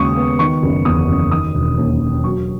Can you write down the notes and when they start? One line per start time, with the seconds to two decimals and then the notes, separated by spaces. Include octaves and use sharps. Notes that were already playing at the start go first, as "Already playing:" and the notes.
Already playing: D#2 C#3 G#3 C#6 D#6
0.16 B3
0.39 D#3 C#6
0.63 F#1
0.85 E2 D#6
1.08 F#1
1.31 D#3 D#6
1.54 E1
1.77 D#2
2.01 E1
2.24 F#3 C#6